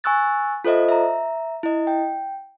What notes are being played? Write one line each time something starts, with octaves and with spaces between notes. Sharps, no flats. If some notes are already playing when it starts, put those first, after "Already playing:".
G#5 C#6 E6 F#6 A6
F4 A4 C5 D#5 E5
E5 A#5
E4 D#5
G5